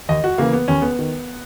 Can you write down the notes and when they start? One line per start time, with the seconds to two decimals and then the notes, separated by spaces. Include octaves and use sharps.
0.09 D#2 D#5
0.24 F#4
0.38 C#3 E3 A#3
0.53 B3
0.68 D#2 C#4
0.82 B3
0.99 D#3